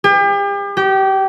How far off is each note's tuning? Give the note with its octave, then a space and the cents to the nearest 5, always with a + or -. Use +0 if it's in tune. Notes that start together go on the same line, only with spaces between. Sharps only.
G4 +40
G4 -25